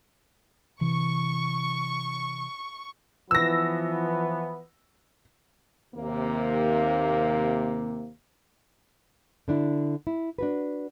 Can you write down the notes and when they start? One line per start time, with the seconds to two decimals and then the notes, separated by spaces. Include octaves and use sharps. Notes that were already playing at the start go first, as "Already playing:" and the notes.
0.81 C3 E3 C#6
3.31 E3 F3 B3 E6 A#6
5.95 D#2 C3 A#3
9.48 D3 D4 E4
10.07 E4
10.38 D4 F#4 B4